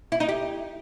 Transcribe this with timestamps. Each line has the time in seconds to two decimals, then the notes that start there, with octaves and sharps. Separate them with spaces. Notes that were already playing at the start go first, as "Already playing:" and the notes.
0.12 E4
0.20 D#4
0.29 G4